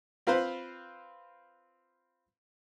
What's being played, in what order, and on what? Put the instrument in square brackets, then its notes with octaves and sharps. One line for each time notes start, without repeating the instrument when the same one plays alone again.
[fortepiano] C4 F4 B4 C5 B5